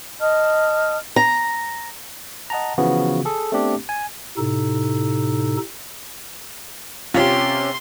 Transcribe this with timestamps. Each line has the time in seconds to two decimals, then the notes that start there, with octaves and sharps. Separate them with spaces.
0.19 D#5 A5 D#6 F6
1.16 A#5
2.50 D#5 F#5 A5 A#5
2.78 C#3 E3 F3 B3 F#4
3.25 G#4 A4
3.52 A3 B3 C4 D4 G4
3.89 G#5
4.37 A2 C3 D#4 A4
7.14 C3 C#4 F4 G4 C#5 C6